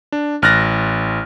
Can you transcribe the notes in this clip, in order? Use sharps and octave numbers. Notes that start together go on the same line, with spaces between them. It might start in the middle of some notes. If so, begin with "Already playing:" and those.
D4
A1 F6 F#6 A6 A#6